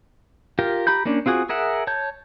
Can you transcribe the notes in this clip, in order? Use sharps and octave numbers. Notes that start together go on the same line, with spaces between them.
F4 G4 A#4
G4 A#5 B5 G6
A#3 C#4 D4
C4 F4 F#4 G#4
G#4 A#4 E5 F#5
C#5 A5 G6